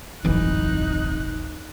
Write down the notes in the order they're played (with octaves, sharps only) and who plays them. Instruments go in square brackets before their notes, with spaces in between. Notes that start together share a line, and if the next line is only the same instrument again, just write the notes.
[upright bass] D1 C3 [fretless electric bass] G1 F2 E3 [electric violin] D#4 F#6